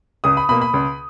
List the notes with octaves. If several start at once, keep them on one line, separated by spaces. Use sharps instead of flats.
C#2 D#6
B5
B2 A#3 B5
B5
C#2